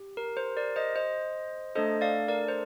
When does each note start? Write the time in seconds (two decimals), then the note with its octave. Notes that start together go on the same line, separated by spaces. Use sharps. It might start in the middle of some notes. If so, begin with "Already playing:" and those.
Already playing: G4
0.17 A#4
0.37 C5
0.57 A#4 D5
0.76 C5 D#5
0.96 C5 D#5
1.75 A3 D4 A4 C5 D#5
2.01 D5 F5
2.28 A#4 D5
2.48 C5